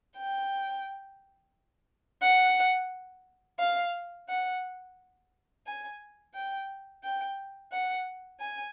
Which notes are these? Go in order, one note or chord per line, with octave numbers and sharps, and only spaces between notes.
G5
F#5
F5
F#5
G#5
G5
G5
F#5
G#5